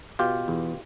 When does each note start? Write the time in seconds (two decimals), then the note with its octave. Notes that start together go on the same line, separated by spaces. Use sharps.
0.19 B2 F4 G4
0.48 E2